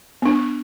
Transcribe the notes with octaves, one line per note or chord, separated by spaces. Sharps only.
B3 D4